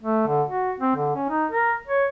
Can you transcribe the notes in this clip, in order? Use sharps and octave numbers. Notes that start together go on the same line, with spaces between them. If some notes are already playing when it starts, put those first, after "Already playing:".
A3
D3
F#4
C4
D3
C#4
D#4
A#4
C#5